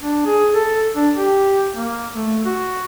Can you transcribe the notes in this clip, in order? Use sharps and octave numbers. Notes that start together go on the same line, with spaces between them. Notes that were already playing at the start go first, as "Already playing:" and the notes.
D4
G#4
A4
D4
G4
A#3
A3
F#4